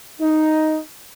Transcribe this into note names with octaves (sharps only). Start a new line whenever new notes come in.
D#4